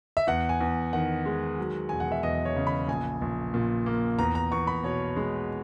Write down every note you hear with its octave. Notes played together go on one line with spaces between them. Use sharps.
E5
E2 F#5
G#5
E2
D#3 F#5
G#3
F#3
E1 G#5
F#5
E5
E2 D#5
C#5
C#3
B5
A#1 G#5
A#1
A#2
A#3
E2 A#5
A#5
E2 C#6
B5
B2 C#5
G#3